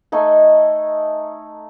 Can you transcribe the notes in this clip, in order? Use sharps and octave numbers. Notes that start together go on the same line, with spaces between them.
A3 D#4 G#5